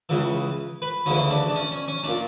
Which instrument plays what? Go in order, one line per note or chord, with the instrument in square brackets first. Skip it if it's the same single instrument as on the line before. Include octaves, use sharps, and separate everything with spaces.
[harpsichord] C#2 C#3 E3
B4
D2 C#3 E3 C#4
D4
D4
C#4
C#4
C#4
A#2 D4